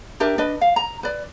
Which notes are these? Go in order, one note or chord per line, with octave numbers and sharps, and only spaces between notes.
D4 G4 A#4 E5
D4 B4 D#5
F5
A#5
B4 D5